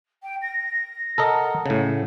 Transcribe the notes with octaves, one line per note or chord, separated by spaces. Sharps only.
G5
A#6
A4 A#4 D#5 F#5
A2 C#3